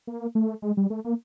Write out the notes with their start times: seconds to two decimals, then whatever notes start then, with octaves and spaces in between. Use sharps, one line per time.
0.07 A#3
0.35 A3
0.62 G#3
0.77 G3
0.90 A3
1.04 A#3